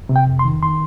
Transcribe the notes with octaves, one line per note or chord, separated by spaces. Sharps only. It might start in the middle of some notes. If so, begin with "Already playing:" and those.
C3
G5
F2
C6
D#3
D#3 C6